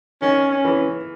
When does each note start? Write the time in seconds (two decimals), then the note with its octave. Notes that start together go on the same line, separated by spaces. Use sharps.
0.22 D#3 C#4
0.51 C#4
0.65 E3